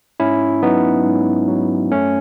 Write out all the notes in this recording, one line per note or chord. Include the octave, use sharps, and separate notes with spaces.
G#2 C#4 E4
F#3 B3 D#4
G#2
F#3
F#2 A3 C#4